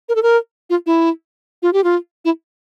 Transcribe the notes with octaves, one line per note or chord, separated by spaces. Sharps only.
A#4
A4
A#4
F4
E4
F4
G4
F4
E4